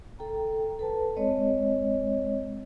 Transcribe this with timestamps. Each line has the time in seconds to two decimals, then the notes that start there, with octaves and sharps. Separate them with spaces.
0.19 A4 G5 A#5
0.79 A4 B4 A5
1.16 G#3 C4 C#5 D#5